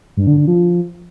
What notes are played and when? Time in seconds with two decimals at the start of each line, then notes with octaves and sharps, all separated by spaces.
0.17 G2
0.27 D3
0.37 D3
0.47 F3